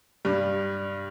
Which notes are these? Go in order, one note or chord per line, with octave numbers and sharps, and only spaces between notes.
G2 G3